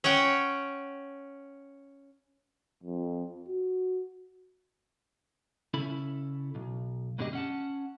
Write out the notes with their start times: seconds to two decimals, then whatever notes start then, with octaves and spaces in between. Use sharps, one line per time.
0.04 C#4 C#5 F#5 G5
2.83 F2
3.48 F#4
5.74 C#3 C#4 E4 A4 B5
6.55 B1
7.18 F#2 B2 D3 G#3 G4 D#5
7.33 C#4 F#5 A5